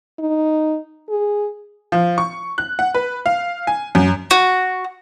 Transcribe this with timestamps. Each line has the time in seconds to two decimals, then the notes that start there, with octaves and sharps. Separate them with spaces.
0.19 D#4
1.10 G#4
1.92 F3
2.18 C#6
2.58 F#6
2.79 F#5
2.95 B4
3.26 F5
3.67 G#5
3.95 F#2
4.31 F#4